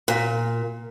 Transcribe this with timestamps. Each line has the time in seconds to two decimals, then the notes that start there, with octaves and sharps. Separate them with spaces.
0.08 A#2